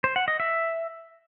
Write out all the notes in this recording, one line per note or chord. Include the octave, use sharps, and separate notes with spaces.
C5
F#5
D#5
E5